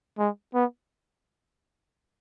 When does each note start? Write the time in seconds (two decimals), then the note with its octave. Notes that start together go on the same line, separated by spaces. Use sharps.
0.18 G#3
0.54 B3